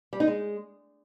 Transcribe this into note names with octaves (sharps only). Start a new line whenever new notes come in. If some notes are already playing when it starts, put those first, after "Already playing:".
G3
D#4
G#3